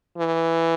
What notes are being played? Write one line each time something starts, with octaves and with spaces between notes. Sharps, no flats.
E3